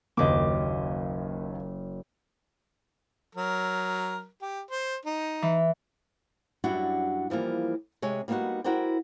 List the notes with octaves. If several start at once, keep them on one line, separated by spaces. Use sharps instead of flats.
F#1 D#2 D#5 D6
F#3 A#4
G4
C5
D#4
E3
F#2 G3 D4 E4 F#4 F#5
E3 F3 G3 A#3
C3 G#3 C#5 G#5
G3 A#3 B3 D4 D#4 F#4
E4 F#4 A#4 C5 D5 G5